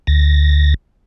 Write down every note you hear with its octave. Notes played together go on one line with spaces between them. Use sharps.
D2 A6 A#6